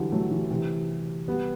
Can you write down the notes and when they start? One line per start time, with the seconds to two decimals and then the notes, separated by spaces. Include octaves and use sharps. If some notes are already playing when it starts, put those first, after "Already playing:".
Already playing: D3 E3 F#3 G3
0.12 F#3 A3
0.31 E3 G3
0.51 C3 E3
1.28 G3 B3